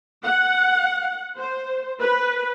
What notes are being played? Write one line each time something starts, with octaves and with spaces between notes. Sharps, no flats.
F#5
C5
B4